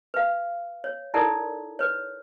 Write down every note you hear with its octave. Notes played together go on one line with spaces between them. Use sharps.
B4 F5
C#5
D#4 E4 A4 A#4 D5 F#5
B4 C#5